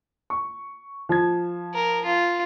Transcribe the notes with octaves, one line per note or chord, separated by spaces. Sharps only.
C#6
F3 G#6
A#4
F4